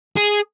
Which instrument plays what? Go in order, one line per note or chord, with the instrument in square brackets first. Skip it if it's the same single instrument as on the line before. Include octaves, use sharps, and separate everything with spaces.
[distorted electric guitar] G#4